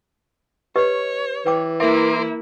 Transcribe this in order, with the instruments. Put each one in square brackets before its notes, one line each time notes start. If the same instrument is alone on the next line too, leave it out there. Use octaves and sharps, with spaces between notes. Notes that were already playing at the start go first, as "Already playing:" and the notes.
[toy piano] G4 B4 D#5 [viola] C#5
[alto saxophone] E3 [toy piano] B4 G5 D6
[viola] A#3 E4 [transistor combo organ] A#4 C6 D6 [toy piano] E5